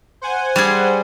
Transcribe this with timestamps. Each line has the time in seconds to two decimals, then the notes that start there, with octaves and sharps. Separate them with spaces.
0.22 C5 F#5 G#5
0.56 G3 G#4